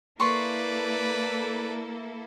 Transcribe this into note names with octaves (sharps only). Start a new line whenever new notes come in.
A#3 E4 A4 B4 D5 C6 C#6